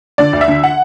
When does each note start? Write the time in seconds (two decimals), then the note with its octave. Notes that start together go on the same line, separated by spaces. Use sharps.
0.18 D3 D5
0.33 D2
0.41 E5
0.48 D3
0.64 F#5